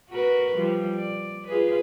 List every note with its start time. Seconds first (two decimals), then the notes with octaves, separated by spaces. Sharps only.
0.10 F#4 A#4 B4
0.56 F3 G3
0.96 D5
1.47 F4 G#4 B4